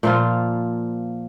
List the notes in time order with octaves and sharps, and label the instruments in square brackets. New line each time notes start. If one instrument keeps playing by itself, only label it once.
[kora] A#2 F3 A#3 F4